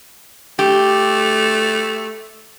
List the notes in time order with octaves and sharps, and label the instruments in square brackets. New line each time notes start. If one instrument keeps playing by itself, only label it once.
[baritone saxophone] A3 [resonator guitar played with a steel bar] G4